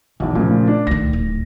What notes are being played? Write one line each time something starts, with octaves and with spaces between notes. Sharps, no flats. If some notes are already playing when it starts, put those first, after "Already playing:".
B1 E2 D#3 E4
A#2 C#3 F3 A3
D4
D2 D#3 A#6
D1